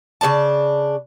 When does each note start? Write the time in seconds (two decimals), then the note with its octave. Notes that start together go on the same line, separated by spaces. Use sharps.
0.21 C#3 G#3 D4 A5